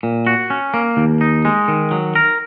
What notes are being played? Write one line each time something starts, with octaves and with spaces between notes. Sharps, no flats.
A#2
F#4
C#4
A#3
D#2
D#4
G#3
D#3
F#3
A#4